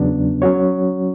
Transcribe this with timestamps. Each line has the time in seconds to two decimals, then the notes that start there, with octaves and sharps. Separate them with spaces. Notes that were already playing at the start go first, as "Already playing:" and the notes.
Already playing: E2 C#3 F#3 B3 D4
0.42 F#3 C#4 F#4 C#5